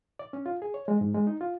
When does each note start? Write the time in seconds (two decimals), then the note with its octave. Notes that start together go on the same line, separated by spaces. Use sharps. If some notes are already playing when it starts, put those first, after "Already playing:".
0.19 D5
0.33 C#4
0.46 F4
0.62 G#4
0.74 C#5
0.88 G#3
1.01 G#2
1.15 G#3
1.27 D#4
1.41 F4